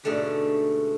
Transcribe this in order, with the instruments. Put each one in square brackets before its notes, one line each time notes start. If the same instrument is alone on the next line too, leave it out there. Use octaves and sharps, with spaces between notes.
[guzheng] G#2 B2 D3 A3 C#4 G4